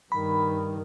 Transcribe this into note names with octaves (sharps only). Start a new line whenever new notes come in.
G2 D#3 B5